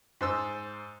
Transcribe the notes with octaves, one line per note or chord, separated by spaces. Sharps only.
G#2 C5 E6